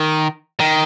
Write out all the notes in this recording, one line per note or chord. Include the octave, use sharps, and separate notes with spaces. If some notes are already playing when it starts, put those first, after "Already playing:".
Already playing: D#3
D#3